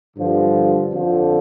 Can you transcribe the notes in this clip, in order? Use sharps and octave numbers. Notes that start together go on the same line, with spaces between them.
G2 D3 F3
F2 D3 F3